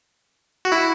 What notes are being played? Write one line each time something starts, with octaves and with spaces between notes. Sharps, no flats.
F#4
E4